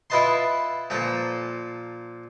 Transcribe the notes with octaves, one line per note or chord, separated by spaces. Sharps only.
E4 F4 B4 D#5 A5 C6
A#2 F3 A4 A#5